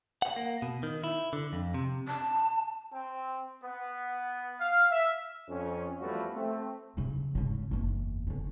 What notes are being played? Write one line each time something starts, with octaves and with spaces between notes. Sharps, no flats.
F#5
A#3
B2
D#3
E4
D3
F2
C3
A5
C4
B3
F5
E5
F2 C#4
E2 F3 G3 A3 F#4 B4
A3 C4
C#3 F#3
G#1 C#3
F#1 E2
D3 C#4